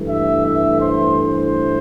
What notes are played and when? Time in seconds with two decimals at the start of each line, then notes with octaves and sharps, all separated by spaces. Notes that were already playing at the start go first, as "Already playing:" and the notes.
Already playing: G2 E3 A3
0.09 E5
0.45 E5
0.81 C5
1.17 C5